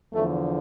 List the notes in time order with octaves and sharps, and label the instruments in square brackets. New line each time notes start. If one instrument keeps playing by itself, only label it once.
[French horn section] E2 D3 F3 A3